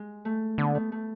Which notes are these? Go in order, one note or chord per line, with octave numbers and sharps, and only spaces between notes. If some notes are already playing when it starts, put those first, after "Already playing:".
Already playing: G#3
A3
D3 B3
A3
A3